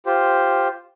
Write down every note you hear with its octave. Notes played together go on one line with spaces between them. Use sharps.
F4 G4 C5